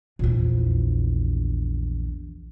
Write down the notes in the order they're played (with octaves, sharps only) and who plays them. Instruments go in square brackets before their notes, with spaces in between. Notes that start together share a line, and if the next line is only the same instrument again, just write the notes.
[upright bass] A#1 E2